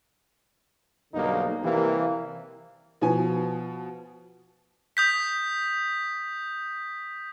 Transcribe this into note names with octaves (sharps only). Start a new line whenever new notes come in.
B1 G2 D3 A#3 D#4
C3 E3 G3 A#3
B2 F3 G#5
D#6 G6 B6